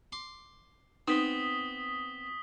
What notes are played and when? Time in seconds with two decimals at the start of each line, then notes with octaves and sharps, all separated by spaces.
0.12 C6 D6
1.08 B3 C4 D#4 D#6 B6 G7